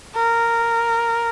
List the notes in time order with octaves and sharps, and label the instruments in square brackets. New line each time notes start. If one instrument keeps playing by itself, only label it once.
[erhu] A#4